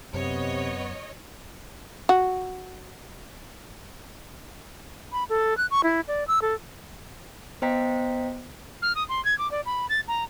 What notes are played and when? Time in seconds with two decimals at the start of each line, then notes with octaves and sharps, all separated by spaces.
0.13 F#2 C3 B3 C#5 D#5
2.09 F#4
5.12 B5
5.30 A4
5.58 F#6
5.71 C#6
5.84 E4
6.08 D5
6.28 E6
6.42 A4
7.62 B3 C5 D#5 G5 A#5 B6
8.82 F6
8.95 D#6
9.09 C6
9.25 G#6
9.38 D6
9.51 D5
9.66 B5
9.89 A6
10.08 A#5